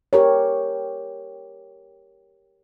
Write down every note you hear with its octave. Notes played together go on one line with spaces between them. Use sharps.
G4 A#4 C#5